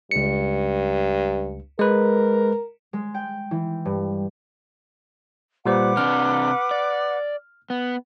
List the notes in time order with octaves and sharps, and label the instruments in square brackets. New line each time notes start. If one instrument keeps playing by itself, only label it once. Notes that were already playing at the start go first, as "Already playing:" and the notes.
[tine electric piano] C#2 C#7 [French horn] G2
[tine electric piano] G#3 B4 [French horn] A#4
[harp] G#3
G5
E3
G2
[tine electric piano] A#2 G3 C5 [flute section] B4 F#5 D6
[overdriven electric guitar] C3 D4 [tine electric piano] F6
[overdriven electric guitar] D5
B3